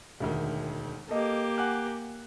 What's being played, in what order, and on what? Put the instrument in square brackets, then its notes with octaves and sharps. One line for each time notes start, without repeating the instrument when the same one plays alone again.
[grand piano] E1 D2 D#3
[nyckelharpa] A#3 G4 [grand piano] A4 D#5
[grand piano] F#5 G#5 F#6